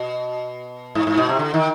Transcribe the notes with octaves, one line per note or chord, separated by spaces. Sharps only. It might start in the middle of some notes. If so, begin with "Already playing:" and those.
Already playing: B2
G#2
G#2
B2
C3
D3
D#3